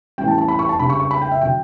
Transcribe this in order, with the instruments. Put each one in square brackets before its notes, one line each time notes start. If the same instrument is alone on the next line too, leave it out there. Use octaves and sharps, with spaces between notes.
[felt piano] A2 E3 G3 C#4 G5
A5
A5
B5
C#6
A5
C#3 G3 D4 B5
C#6
C#6
B5
G5
E5
D3 F#3 G5